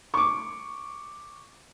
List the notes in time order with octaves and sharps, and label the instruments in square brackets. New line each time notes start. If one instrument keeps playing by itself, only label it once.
[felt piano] C#6 D6